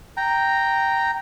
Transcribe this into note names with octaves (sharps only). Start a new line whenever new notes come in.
G5 A#5